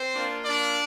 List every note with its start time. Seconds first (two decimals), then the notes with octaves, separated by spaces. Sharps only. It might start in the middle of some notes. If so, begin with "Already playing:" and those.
Already playing: C4 C5
0.14 A#3 D4 F4
0.45 D4 D5